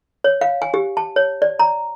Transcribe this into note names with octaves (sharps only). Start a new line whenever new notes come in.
C#5
F5
G#5
G4
A5
C#5
D5
A#5